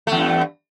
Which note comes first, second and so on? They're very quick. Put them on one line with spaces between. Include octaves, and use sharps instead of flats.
A3 E2 G2